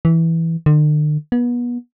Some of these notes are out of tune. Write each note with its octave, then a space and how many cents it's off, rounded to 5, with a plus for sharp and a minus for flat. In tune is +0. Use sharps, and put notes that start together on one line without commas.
E3 -5
D3 +45
B3 -30